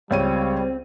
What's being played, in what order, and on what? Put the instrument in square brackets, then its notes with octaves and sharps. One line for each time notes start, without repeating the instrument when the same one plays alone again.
[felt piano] C#2 C#5 D#7 [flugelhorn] G3 [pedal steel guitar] C4